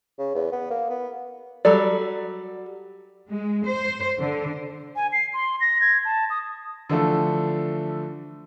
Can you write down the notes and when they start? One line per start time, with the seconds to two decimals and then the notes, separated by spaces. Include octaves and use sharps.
0.19 C#3
0.35 E2
0.52 B3
0.71 A#3
0.90 B3
1.65 F#3 G3 A4 D5
3.29 G#3
3.66 C5
4.20 D3
4.96 G#5
5.13 C7
5.34 C6
5.61 A#6
5.81 G#6
6.05 A5
6.30 D#6
6.90 D3 E3 F3 A3 A4